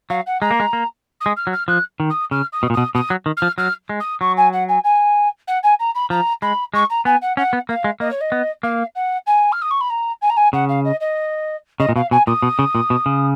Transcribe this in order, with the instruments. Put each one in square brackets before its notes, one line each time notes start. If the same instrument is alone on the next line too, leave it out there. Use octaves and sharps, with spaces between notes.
[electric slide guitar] F#3 [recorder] F5
[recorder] F#5
[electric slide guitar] G#3 [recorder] A#5
[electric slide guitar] A#3
G#3
A#3
[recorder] D#6
[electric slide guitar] G#3
[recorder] F6
[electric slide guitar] F#3
[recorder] F6
[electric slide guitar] F3 [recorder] F#6
[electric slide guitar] D#3
[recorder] D#6
[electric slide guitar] C#3 [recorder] F6
[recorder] D#6
[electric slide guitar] B2
A#2
[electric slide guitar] B2 [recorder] D#6
[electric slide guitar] B2 [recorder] D#6
[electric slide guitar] F#3
D#3
[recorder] F6
[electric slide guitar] F3
[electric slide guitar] F#3 [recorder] F6
[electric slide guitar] G#3
[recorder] D#6
[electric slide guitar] F#3 [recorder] C#6
[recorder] G#5
F#5
G#5
G#5
F#5
G#5
A#5
B5
[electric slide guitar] F3 [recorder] A#5
[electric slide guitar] G#3 [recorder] B5
[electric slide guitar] G#3 [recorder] C#6
[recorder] A#5
[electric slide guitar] B3 [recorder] G#5
[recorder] F#5
[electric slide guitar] C#4 [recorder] F#5
[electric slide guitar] B3
[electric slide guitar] A#3 [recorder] F5
[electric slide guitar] G#3
[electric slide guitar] A#3 [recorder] D#5
[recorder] C#5
D#5
[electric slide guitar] B3
[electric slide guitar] A#3 [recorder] F5
[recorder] F#5
G#5
F6
D#6
C#6
B5
A#5
G#5
A#5
G#5
[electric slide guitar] C#3 [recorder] F#5
[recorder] F5
D#5
D#5
[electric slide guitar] C#3 [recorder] D#5
[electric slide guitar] A#2
[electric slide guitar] B2 [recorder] F5
[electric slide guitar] B2 [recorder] G#5
[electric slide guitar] A#2 [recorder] D#6
[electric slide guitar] B2
C#3
A#2
B2
C#3